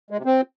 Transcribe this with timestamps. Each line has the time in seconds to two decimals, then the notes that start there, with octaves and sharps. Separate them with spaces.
0.11 G#3
0.18 C3
0.25 C4